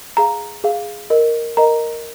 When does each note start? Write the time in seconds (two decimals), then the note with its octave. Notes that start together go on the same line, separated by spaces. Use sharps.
0.17 G#4 F5 A#5
0.64 G#4 F5
1.10 A#4 D#5
1.57 A#4 D#5 A#5